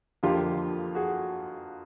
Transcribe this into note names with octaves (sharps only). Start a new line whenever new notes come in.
F2 D3 F3 A#3 F4 G4
F#4 G#4